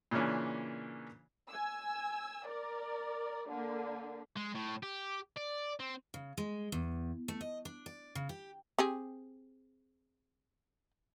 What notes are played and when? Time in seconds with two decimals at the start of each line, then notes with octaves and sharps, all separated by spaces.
0.11 A#2 C#3 E3 A#3 C#4 D4
1.49 G#5 E6
2.47 A#4 D5
3.49 D3 A#3
4.37 G#3
4.55 A2
4.83 G4
5.37 D5
5.80 C4
6.14 C#3
6.37 G#3
6.72 E2
7.28 A3
7.41 D#5
7.65 D4
7.86 D5
8.15 C#3
8.29 G4
8.79 C4 G4 G#4